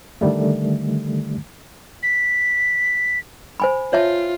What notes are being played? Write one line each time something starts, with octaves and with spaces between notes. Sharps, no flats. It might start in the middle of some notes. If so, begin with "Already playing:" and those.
D3 D#3 G3 A3
B6
C5 G#5 B5
F4 C#5 E5 A5